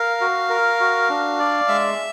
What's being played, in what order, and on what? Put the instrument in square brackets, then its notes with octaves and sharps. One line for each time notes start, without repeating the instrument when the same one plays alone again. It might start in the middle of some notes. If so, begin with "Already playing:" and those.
Already playing: [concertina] A#4 [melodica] F5
[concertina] F#4
A#4
F#4
D4
D5
[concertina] G#3 [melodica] E5